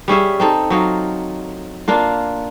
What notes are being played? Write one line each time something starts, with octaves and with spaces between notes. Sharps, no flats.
G3 C#4 G#4 E5
C4 D#4 A4
F#3 D#4 F4
A#3 D4 F4